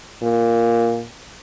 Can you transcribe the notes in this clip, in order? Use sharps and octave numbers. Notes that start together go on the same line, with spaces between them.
A#2